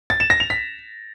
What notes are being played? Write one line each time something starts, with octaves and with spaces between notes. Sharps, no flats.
A6
E7
A#6
F7
B6